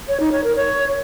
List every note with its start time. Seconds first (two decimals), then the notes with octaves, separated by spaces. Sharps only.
0.08 C#5
0.20 D#4
0.32 C#5
0.44 A#4
0.56 C#5